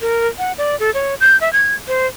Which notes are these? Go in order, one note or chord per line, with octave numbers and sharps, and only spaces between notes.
A#4
F#5
D5
A4
C#5
G6
E5
G#6
C5